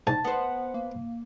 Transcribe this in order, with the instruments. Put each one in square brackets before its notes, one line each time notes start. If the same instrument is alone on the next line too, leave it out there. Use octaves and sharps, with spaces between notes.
[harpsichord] G#2 [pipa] A5
[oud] B3 C5 [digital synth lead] F#5
[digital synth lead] A#3